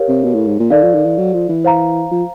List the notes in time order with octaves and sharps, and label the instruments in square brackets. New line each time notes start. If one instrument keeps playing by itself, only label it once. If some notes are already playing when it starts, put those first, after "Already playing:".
Already playing: [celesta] G4 A#4 C#5 F5
[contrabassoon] C3
B2
A2
G#2
A#2
[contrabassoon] D#3 [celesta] A4 D5 F5
[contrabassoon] F3
D#3
E3
F#3
F3
E3
[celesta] C5 F5 A#5
[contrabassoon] F3